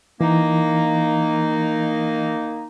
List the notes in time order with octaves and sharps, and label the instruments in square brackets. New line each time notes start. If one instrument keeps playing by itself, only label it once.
[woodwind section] D#3 A#3 D#4 [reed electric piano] E3